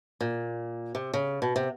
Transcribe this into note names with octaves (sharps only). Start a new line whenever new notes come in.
A#2
C3
C#3
B2
C3